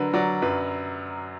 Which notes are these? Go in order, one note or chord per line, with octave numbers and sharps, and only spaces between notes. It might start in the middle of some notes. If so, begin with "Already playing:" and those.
Already playing: D3 F#3 A#4 B4
F#3 D5
F#2 B4